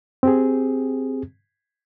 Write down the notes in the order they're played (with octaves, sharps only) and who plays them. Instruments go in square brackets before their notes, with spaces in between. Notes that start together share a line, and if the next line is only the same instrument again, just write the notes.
[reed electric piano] C4 G4 G#4